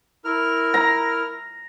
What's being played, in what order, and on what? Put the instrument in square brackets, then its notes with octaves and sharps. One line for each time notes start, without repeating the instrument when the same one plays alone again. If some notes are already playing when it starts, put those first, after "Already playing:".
[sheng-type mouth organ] E4 A#4 F6
[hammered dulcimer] A#5